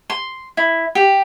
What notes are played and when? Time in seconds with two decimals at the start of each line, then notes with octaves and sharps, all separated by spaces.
0.10 C6
0.57 E4
0.95 G4